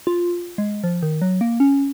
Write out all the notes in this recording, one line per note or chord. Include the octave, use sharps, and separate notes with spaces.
F4
G#3
F3
D#3
F#3
A#3
C#4